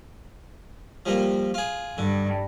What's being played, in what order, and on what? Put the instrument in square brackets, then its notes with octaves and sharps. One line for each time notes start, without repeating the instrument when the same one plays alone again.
[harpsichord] F3 G3 A#3
F4 G#4
[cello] G2 [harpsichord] D3